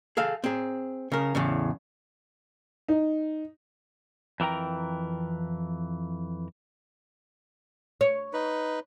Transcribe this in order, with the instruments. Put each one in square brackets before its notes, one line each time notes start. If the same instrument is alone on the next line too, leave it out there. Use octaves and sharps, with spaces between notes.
[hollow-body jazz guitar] G#4 A4 F5
C4 G#4
C#3 A#4
E2 A2 C#3
[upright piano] D#4
[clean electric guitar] F2 E3 A#4 G5 A#5
[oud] C#5
[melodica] D#4 B4